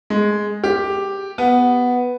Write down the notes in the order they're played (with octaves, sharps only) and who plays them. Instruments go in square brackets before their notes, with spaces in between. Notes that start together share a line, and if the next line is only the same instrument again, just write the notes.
[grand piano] G#3
G4
B3